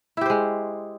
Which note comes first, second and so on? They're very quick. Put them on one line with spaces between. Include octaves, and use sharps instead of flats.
E4 G4 C5 G#3